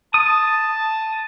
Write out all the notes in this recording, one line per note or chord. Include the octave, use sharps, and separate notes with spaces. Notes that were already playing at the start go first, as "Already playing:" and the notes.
A5 D#6